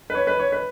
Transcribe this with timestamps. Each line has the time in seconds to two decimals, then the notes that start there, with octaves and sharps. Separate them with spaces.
0.10 B4
0.15 C#5
0.27 B4
0.39 C#5
0.52 B4